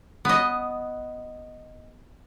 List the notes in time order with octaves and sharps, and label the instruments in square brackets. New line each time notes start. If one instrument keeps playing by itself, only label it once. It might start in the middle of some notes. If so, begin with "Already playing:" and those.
[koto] B3 D#5